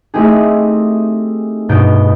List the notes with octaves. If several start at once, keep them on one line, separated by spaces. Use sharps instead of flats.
A3 C4 D#4 E4 G4 G#4
G2 B2 B3 D#4 G6 D7